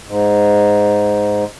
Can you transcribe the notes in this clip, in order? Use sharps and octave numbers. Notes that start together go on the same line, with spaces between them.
G#2